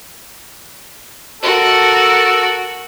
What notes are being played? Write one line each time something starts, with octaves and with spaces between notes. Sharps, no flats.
F#4 A4 A#4